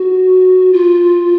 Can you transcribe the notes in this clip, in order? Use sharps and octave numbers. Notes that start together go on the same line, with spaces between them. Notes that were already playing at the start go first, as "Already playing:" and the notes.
Already playing: F#4
F4